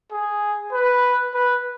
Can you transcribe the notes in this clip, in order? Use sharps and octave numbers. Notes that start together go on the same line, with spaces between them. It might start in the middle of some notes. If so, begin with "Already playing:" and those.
G#4
B4
B4